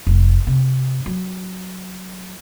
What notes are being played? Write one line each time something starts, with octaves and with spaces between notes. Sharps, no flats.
F1
C3
F#3